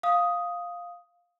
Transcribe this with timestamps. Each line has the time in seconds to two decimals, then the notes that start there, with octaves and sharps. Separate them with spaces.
0.03 F5 D#6